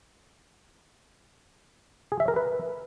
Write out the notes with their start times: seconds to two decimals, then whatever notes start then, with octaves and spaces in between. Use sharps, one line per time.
2.12 G#4
2.20 E5
2.28 A#4
2.36 B4